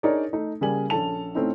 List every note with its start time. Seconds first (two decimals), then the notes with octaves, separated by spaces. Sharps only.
0.03 D4 D#4 G#4 A#4 C#5 D5
0.33 A3 D#4
0.61 C#3 G3 A#3 G#4 G#5 F#7
0.90 A#1 C#4 A4 A5 F7
1.35 A2 A3 C4 C#4 D#4